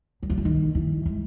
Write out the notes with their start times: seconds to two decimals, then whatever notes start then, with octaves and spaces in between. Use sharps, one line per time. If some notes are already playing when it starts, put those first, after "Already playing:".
0.23 F#3
0.30 F3
0.38 E3
0.45 D#3
0.75 E3
1.06 G#3